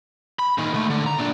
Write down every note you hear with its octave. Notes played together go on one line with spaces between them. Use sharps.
B5
A#2 D#3
D3 A3
D3
A#5
A#2 D4